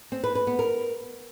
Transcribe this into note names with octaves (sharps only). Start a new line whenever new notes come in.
C4
B4
B4
B3
A#4